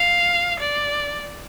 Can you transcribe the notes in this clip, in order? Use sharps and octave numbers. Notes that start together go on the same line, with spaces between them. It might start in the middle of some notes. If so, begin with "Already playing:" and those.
Already playing: F5
D5